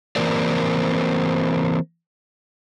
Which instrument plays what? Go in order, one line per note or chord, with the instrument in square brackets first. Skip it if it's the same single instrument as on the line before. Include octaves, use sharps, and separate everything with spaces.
[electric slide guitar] E3 A#3 C4 A#4 D5